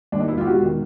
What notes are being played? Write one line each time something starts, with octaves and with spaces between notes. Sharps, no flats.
D#2 D4
D#4
E1 E4
F4 G4
E1 F#4
D#3